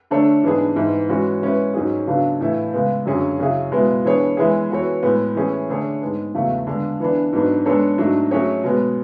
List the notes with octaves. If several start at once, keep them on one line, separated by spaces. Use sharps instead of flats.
D3 A3 D4 A4 C#5
G#2 E3 B3 D4 G#4
G#2 E3 B3 E4
E3 G#3 C#4 F#4
G#3 C#4 E4 B4
G#2 F#3 C#4 G#4
C#3 F#3 B3 D4 A4
A2 E3 A3 E4
C#3 G#3 B3
F#2 D3 F#3 C#4 G#4
C#3 F#3 C#4 E4 G#4
B2 G#3 B3 E4
E3 B3 D4 G#4 C#5
E3 G#3 B3 E4 G#4
E3 B3 F#4 A4 C#5
A2 G#3 B3
E3 A3 C#4 G#4
D3 A3 D4 G#4 C#5
G#2 G#3 B3
E2 C#3 F#3 A3
D3 G#3 B3 D4
E3 B3 D4
G#2 F#3 B3 D4
G#3 B3 D4 A4 C#5
G#2 F#3 A3 D4
F#3 A3 C#4 G#4 C#5
B2 G#3 B3